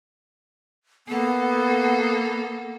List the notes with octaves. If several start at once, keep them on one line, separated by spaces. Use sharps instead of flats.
A#3 B3 A4